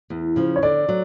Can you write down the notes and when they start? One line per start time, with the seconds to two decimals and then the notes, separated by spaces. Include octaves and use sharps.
0.10 E2
0.36 C#3 F3
0.56 C#5
0.63 D3 D5
0.89 F#3